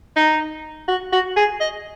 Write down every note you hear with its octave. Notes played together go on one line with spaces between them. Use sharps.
D#4
F#4
F#4
G#4
D#5